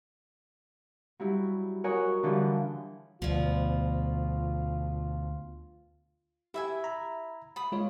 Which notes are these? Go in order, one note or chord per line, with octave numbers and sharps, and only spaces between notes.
F#3 G3 E4
F#4 A#4 C#5 D#5 F#5 G#5
D3 E3 F3 G3
D2 B2 F3 F4
E4 G4 E5 G#5
A#5 B5
B5 D#6
G#3 F4 C#5